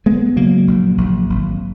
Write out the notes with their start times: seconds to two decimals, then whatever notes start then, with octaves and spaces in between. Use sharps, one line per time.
0.06 G#1 G#3 B3
0.36 C#3 F#3 A#3
0.67 A#1
0.97 A#1
1.30 G#1